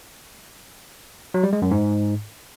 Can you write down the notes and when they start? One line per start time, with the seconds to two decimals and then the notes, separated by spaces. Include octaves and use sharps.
1.34 F#3
1.44 G3
1.53 G#3
1.62 F#2
1.71 G#2